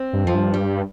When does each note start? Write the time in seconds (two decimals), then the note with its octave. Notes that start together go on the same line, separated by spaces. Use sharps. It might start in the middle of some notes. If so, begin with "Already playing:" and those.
Already playing: C4
0.13 G2
0.25 F2 F3
0.35 G2
0.54 G3